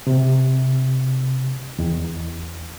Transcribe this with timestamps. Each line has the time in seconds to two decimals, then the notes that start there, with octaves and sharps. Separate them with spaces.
0.07 C3
1.79 E2